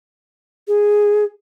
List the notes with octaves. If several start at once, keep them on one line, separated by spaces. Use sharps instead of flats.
G#4